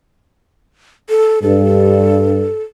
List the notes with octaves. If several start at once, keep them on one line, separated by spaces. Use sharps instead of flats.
A4
G2 A4